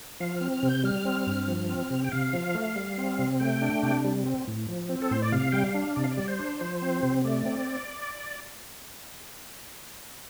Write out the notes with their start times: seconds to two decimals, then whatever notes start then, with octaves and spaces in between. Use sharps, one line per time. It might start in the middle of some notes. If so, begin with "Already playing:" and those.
0.20 F3 F5
0.36 C4 F6
0.53 F6
0.63 C3
0.68 G6
0.84 G3 F6
1.05 C4
1.27 G2
1.48 F3
1.69 C4
1.90 C3
2.04 G5
2.12 C3 F5
2.33 F3
2.55 A3
2.76 G3
2.98 C4
3.19 C3
3.40 A3 G5
3.62 D4
3.83 C3
4.04 G3
4.26 C4
4.47 A2
4.68 F3
4.89 C4
5.02 A4
5.11 A2 C5
5.22 D5
5.32 C3 F5
5.52 G3 G5
5.64 F5
5.74 D4
5.96 C3 D5
6.04 F5
6.11 D5
6.17 G3
6.28 C5
6.39 D4
6.61 F3
6.82 C4
7.03 C3
7.24 A3 D5
7.46 C4